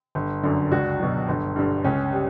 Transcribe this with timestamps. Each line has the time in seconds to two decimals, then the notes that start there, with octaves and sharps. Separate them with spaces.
0.15 G1
0.43 F#2 D3
0.71 C#2 D4 F#4
1.00 B2 F#3
1.28 G1
1.56 G2 D3
1.84 C#2 C#4
2.13 G3